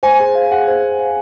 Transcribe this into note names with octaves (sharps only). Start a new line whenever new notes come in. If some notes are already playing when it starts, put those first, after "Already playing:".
C5 G#5
G#4
F5
G#4 F#5
C5
G#4
F5